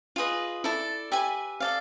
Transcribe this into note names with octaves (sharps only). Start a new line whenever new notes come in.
F4 G#4 B4 D#5
E4 A4 D5
G4 B4 E5 G#5
A4 D5 F5